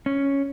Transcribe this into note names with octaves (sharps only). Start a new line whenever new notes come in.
C#4